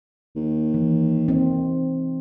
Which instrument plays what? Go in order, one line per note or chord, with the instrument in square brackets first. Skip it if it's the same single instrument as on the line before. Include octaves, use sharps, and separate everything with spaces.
[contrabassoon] D#2
[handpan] E3
C4 D#4